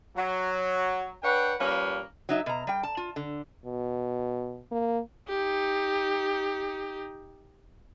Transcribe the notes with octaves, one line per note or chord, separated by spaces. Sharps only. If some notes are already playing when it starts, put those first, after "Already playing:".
F#3
D4 B4 C#5 F#5 G5
F3 G3 A#3 C#4 B4
F#3 D#4 E5
B2 A#5
G3 G5
A5
F4
D3
B2
A#3
D#4 G4